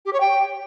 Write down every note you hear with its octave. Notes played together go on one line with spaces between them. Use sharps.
G4
C#5
G5